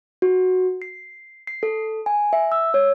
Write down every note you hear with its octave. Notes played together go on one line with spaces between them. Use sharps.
F#4
C7
C7
A4
G#5
E5
E6
C#5